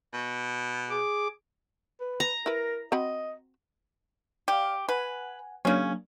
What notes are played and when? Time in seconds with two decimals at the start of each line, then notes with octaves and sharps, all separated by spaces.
0.13 B2
0.90 G#4 D6
2.00 B4
2.20 A#5
2.46 E4 A#4 B4
2.92 C4 F#4 D#5 B5
4.48 G4 D5 F5
4.89 B4 F#5 G#5
5.65 C#3 F#3 A#3 C#4 D4